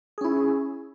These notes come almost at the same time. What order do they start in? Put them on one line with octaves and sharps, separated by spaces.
G#4 C#4 E4